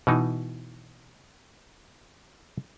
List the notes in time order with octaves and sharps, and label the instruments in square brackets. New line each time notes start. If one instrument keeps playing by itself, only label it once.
[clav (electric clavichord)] B2 E3 D#4